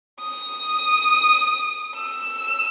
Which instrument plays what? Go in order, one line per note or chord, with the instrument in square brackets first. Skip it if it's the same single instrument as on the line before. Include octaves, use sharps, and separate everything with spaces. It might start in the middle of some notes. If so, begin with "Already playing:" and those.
[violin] D#6
E6